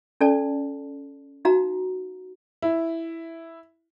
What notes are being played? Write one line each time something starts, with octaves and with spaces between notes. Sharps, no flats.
C#4 A4 D5 A5
D#4 F#4 F5 A#5
E4